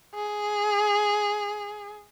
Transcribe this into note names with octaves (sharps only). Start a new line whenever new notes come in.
G#4